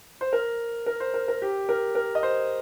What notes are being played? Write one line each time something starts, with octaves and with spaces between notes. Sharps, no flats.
C5
A#4
A#4
C5
A#4
A#4
G4
A#4
A#4
D#5
C5